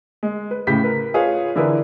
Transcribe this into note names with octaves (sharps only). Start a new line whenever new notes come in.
G#3
B4
A2 C#3 G4 G6 B6
A#4 B4
F4 G#4 B4 C#5 F5
D3 E3 E4 G#4 A#4 B4